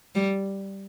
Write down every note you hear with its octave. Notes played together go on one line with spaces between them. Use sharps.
G3